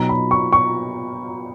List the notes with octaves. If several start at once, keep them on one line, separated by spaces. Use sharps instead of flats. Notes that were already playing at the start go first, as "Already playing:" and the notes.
Already playing: B2 F#3 B3 D#4 A#5
B5
C#6
C#6